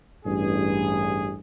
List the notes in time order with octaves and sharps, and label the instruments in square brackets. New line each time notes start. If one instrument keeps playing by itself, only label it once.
[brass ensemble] A1 G2 G#4